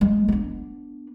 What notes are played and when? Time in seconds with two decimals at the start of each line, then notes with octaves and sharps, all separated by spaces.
0.01 G#3
0.28 B3 D4